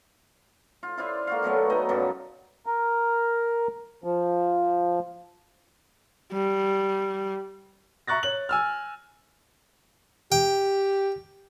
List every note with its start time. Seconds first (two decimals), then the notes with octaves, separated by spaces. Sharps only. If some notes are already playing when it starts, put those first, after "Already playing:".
0.83 F4
0.98 E4 F4 C5 D5
1.27 A#3 F#4 F5
1.43 B2 F#3 A3 B3
1.70 B3 D#4 D#5 G5
1.89 F#2 A#2 F#3 G3
2.66 A#4
4.04 F3
6.32 G3
8.07 E5 A#5 C#6 F#6 A6 A#6
8.23 C#5 F#7
8.49 G#5 E6 F6
10.32 G4 G5